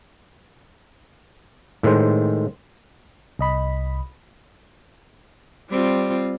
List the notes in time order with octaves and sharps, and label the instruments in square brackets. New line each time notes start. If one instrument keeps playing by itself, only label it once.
[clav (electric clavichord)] A2 D#3 G#3 C5
[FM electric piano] C2 D#5 B5
[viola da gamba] G3 C4 F4